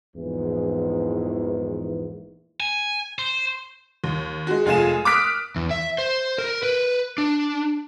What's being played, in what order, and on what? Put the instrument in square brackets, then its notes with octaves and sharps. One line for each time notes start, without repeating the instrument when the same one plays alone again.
[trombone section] A#1 E2 G#2 E3
[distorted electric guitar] G#5
C5
[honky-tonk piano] D#2
G#3 F#4
F1 G#3 F4 G#5 E7
D6 D#6 F6 F#6 B6 D7
[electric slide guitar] E2
E5
C5
A#4
B4
D4